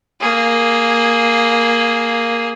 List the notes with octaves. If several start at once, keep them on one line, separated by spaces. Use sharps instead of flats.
A#3 G#4